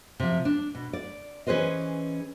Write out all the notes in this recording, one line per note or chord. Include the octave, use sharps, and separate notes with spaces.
C3 F3
D4
B2
D5
E3 C#4 G#4 B4 C5 D#5